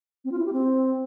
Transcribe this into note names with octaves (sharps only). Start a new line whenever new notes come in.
C4
F4
E4
G4
C4